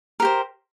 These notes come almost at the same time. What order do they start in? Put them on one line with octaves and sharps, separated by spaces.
A#4 G4 C5